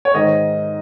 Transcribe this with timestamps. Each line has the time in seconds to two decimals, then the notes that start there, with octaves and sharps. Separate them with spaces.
0.05 C#5
0.14 G#2 D#3 D#5